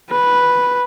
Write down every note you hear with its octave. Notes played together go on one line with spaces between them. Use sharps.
B4